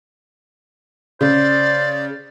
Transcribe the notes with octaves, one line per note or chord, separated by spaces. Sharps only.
C#3 C5 D5